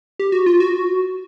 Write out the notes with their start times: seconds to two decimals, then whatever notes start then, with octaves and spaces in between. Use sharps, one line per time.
0.19 G4
0.32 F#4
0.46 F4
0.60 F#4